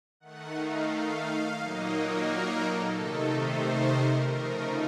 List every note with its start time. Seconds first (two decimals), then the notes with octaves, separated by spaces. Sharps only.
0.20 D#3 A3 D#4 F#5
0.54 F5
0.88 F5
1.56 A#2 F#3 A#3 D#4 D#5
1.90 A#4
2.58 A4
2.92 C3 D#3 A3 D#4 A4
3.27 C5
3.94 A#4
4.28 C#3 F3 A3 D#4 A#4